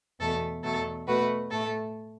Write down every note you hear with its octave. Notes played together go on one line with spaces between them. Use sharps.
E2 B2 A3 A4
E2 B2 F#3 A3 A4
B2 A3 F#4 B4
A2 A3 A4